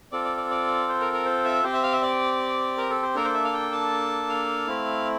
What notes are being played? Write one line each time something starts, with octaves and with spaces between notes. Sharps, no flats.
C4 F4 A4 D5
D5
D5
D5
C5
A#4
A#4
C5
E5
C4 G4 C5
E5
F5
E5
D5
A#4
A4
C5
A#3 D4 A4 A#4
C5
E5
F5
G5
A5
F5
A3 C4 E4